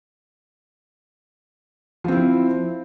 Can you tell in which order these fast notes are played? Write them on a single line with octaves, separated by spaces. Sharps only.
F3 C4 E4